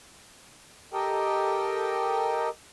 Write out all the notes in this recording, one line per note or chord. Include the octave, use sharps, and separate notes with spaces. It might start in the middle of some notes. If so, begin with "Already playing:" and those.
G4 A4 A#4 D#5 G5